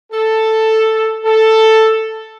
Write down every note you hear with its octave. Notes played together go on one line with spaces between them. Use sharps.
A4
A4